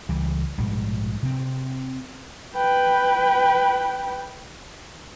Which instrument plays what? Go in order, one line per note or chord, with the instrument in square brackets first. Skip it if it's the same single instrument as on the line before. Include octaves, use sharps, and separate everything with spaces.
[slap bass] C#2 E3 G3
A#1 G#2 B2 G3
C3 C4
[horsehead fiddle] B4 G5